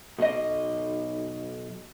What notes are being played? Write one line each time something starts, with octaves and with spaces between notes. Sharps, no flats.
B1 D#5